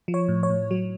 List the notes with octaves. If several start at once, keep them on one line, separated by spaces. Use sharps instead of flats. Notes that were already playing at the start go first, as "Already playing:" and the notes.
F3
C#5
A2
C#5
A2
F#3